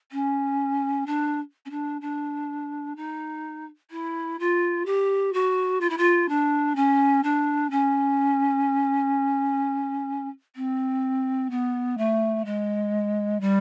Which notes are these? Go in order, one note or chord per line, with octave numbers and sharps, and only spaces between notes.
C#4
D4
C#4
D4
D4
D#4
E4
F4
G4
F#4
F4
E4
F4
D4
C#4
D4
C#4
C4
B3
A3
G#3
G3